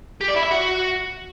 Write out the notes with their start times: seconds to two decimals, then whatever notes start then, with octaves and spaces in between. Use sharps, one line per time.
0.21 G4
0.28 D5
0.36 E4
0.43 E5
0.51 F#4